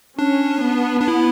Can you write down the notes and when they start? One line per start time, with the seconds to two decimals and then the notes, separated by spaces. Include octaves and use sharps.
0.18 C#4 D4
0.63 B3
1.00 D4
1.08 E4